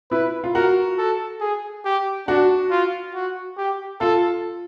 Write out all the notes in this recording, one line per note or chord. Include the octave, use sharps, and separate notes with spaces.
E4 B4
F4
F#4 A#4
A4
G#4
G4
D4 F#4
F4
F#4
G4
F4 A4